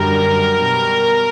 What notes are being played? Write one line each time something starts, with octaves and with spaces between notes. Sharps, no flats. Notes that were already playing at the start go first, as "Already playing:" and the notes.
Already playing: F#2 D3 G3 A#4
B2 G3